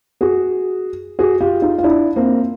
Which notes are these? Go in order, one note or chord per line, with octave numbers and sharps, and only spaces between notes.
F#4 G#4
F#4 G#4
F4 G4
D#4 F4
F4
D4 E4
A#3 C4